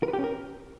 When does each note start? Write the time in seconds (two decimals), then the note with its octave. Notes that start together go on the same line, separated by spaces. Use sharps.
0.03 A#4
0.08 B4
0.13 G4
0.19 C#4
0.24 A#4